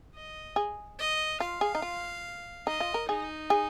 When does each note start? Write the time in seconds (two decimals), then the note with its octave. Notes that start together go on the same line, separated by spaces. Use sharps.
0.15 D#5
0.56 G#4
0.99 D#5
1.40 F4 F5
1.61 G#4
1.75 D#4
1.82 F4
2.67 D#4 D#5
2.80 F4
2.94 A#4
3.08 D#4 G#4
3.50 G#4